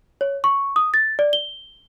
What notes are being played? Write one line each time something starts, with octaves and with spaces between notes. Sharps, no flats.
C#5
C#6
D#6
A6
D5
G7